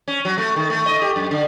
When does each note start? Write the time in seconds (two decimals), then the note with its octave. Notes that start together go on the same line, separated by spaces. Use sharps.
0.08 C#4
0.25 F#3
0.38 A3
0.56 D#3
0.70 A3
0.86 D#5
1.02 G4
1.16 F#2
1.31 D3